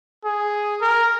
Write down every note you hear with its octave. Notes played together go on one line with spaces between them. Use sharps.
G#4
A#4